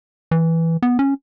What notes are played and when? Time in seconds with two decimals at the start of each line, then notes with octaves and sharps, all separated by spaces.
0.31 E3
0.82 B3
0.99 C#4